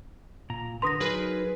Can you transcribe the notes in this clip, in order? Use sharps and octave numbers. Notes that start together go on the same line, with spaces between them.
A#2 A#5
D3 B4 A#5 C6 D#6 A#6
F#3 D#4 G#4 A#4 B4